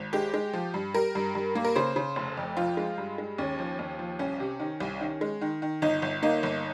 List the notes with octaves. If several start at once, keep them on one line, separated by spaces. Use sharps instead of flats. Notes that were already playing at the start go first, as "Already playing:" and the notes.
Already playing: G#1
G#3 G4
G#3
F3
G2
G3 A#4
G2
G2
A#3
A#4
C#3 C5
C#3
F1
F2
F3 F4
G#3
G2
G#3
D#2 C#4
F3
D#2
F3
C2 C#4
C3
D#3
C2
D#3
G#3
D#3
D#3
G1 D#4
G1
A#3 D#4
G1